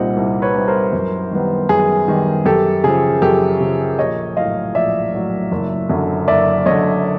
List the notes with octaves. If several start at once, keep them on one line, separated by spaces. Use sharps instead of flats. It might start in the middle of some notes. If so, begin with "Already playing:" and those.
Already playing: C2 A#2 G3 C4 D#4 F#5
C2
B4 C#5
A#2 G3 C4 D#4
A#4 C5
F#2
D#3 G3 B3
F#2 G#4
D#3 G3 B3
F#2 G4 A4
C#3 F3 G#4
F#2 G4 A4
C#3 F3
A#1 C#5 D#5
A2 F#3 D#5 F5
A#1 D5 E5
A2 F#3
F#1
F#2 D3
F#1 D5 E5
F#2 D3 C#5 D#5